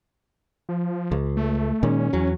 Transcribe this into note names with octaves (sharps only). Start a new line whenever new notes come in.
F3
C#2
A3
A#2 D#3 G#3 C#4
E2 F#3